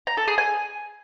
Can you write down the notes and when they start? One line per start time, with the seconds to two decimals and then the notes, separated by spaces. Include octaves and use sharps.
0.07 A#5
0.17 A4
0.28 G#4
0.38 G#5